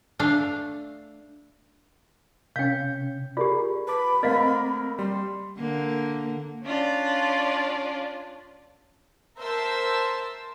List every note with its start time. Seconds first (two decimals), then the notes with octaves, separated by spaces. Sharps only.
0.19 A3 D4 F5
2.56 C3 C#4 F5 G5 G6
3.37 F4 G4 G#4 A#4 D5
3.87 B4 A5 B5 D6
4.23 A3 A#3 C4 A#4 D#5 F5 F#5
4.99 G3 C6
5.58 D3 A#3
6.64 C#4 D4 F4 D5
9.39 A#4 C5 E5 A5 C6 E6